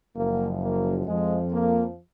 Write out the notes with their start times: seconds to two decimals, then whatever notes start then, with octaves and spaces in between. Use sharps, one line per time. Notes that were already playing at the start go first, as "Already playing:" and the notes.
0.16 F#1 F#2 F3 A#3
0.62 A#3
1.06 F2 F3 G#3
1.52 A#3